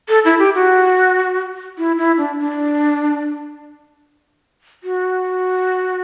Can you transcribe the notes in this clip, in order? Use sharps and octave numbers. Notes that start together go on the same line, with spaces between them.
A4
E4
G4
F#4
E4
E4
D4
D4
F#4